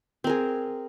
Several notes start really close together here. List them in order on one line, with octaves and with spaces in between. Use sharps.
C4 A#4 G#4